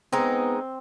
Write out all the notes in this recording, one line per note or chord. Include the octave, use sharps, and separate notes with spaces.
G#3 B3 C4 D#4